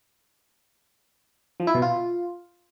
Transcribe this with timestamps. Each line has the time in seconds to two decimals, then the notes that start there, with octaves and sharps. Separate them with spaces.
1.60 F3
1.67 E4
1.75 B2
1.82 F4